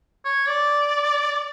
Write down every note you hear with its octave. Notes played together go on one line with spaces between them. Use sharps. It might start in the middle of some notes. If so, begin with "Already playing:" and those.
C#5
D5